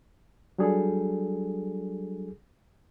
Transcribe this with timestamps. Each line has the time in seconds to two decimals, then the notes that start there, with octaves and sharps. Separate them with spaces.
0.58 F#3 G3 D4 G#4 A4